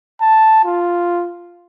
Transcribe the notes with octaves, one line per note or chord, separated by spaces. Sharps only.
A5
F4